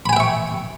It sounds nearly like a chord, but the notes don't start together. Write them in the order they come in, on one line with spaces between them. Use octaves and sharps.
B5 G#5 G5 E5 C#6